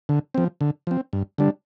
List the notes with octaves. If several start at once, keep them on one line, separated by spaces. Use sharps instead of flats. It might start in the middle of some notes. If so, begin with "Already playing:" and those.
D3
F3 C4
D3
F3 C4
G2
D3 G3 D4